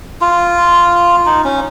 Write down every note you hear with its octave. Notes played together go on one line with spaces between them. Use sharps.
F4
D#4
C#4